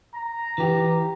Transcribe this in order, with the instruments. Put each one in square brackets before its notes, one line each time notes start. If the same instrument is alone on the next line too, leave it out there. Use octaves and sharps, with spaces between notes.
[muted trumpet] A#5
[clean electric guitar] E3 G4